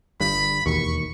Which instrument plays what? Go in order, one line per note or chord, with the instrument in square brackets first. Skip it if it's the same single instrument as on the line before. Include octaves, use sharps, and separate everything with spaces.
[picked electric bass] G1 G2 [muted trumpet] B5
[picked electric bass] E1 D#2 [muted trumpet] C#6